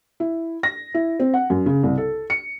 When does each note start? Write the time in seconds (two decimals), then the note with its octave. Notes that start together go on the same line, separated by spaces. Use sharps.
0.20 E4
0.63 A#6
0.94 E4
1.20 C4
1.34 F#5
1.50 F#2
1.66 C#3
1.83 C2
1.97 A4
2.30 C#7